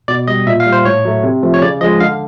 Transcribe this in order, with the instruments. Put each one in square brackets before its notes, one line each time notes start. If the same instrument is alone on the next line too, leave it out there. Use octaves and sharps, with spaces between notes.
[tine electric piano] B2 D5
G3 D#5
A#2 E5
F5
G3
C5
A2 C#5
F#3 A3
C3
F3 A3
C#5
C#3 D5
F3 G#3 D#5
D3 F5